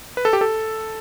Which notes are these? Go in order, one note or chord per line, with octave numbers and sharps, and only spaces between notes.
B4
A4
G4
A4